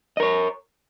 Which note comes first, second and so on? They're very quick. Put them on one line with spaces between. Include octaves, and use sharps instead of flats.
D#5 A#4 C#5